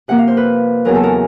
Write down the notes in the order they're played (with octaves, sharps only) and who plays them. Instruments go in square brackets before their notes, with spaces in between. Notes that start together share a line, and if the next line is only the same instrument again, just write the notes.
[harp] C3 F3 A#3 F#5
F5
C5
B4
E2 C#3 F#3 A#4
A4
A#4